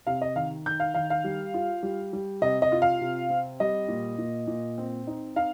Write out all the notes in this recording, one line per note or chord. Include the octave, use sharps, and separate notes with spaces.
C3 F5
D#5
D#3 F5
D#3 G6
F5
D#3 F5
F5
G3
F4
G3
G3
C3 D#5
D#5
F4
F5
C3
C4
G3 D#5
A#2
A#2
A#2
C4
D#4
D#4 F5